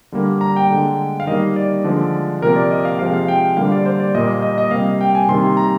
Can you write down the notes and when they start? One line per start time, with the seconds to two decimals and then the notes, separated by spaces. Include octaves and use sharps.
0.12 D3 G3 A#3
0.41 A#5
0.56 G5
0.70 D3 G#3
1.20 F5
1.27 D#3 G3 A#3 D#5
1.56 D5
1.84 D3 F3 G#3
2.42 C3 F3 A#3 A#4
2.56 D5
2.71 D#5
2.85 F5
2.99 C3 F3 G#3 F5
3.14 F5
3.28 G5
3.57 D3 G3 A#3 F5
3.72 D5
3.86 C5
4.00 D5
4.15 A#2 G3 A#3 D#5
4.42 D#5
4.58 D#5
4.71 C3 G3 A#3 F5
5.01 G5
5.15 G#5
5.29 C3 D#3 G3 A#3 C6
5.57 A#5